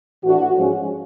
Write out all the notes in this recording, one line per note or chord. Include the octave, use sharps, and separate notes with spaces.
A2 E3 A3 D4 F#4
G#2 F3 G#3 C#4